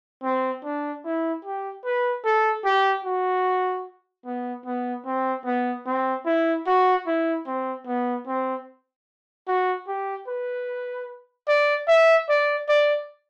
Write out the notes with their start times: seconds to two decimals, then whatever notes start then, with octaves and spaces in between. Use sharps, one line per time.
0.23 C4
0.64 D4
1.05 E4
1.45 G4
1.85 B4
2.25 A4
2.65 G4
3.05 F#4
4.25 B3
4.66 B3
5.06 C4
5.46 B3
5.86 C4
6.26 E4
6.67 F#4
7.07 E4
7.47 C4
7.87 B3
8.27 C4
9.48 F#4
9.88 G4
10.28 B4
11.48 D5
11.88 E5
12.29 D5
12.69 D5